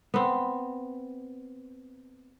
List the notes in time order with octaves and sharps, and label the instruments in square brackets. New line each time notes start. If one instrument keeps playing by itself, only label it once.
[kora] B3 C4